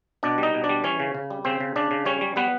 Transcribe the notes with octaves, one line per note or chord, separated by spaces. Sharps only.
B2 D4 D5
G3 D#4 D#5
B2
D4 D5
G3
E3 C#4 C#5
C#3
C#3
G3
C#3 C4 C5
C#3
C#3 D4 D5
C#3
G3 C#4 C#5
G3
G3 B3 B4